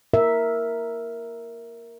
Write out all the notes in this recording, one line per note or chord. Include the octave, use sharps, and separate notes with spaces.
A#4 E5